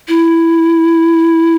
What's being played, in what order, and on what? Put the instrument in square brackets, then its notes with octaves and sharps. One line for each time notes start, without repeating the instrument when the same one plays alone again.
[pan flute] E4